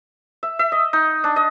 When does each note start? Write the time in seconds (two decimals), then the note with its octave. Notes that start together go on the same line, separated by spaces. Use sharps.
0.43 E5
0.59 E5
0.72 D#5
0.93 D#4
1.24 D4
1.36 D#5